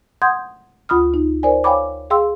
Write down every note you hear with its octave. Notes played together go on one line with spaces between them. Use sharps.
F#5 C6 D#6 G6 G#6
D2 F4 B5 D#6 F6
D#4
A#4 C5 D5 G#5
C#5 F5 G5 G#5 B5 D6
G#4 F5 G5 C6 E6